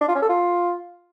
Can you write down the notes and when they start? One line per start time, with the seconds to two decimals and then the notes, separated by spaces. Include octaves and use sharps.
0.01 D4
0.08 F4
0.15 C#4
0.22 A4
0.29 F4